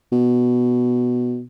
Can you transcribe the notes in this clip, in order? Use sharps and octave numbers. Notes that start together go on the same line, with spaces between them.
B2